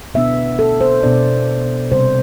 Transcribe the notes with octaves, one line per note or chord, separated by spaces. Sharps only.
B2 B3 D4 E5
A4
C5
B2 B3 D4 D5
C3 G3 C4 C5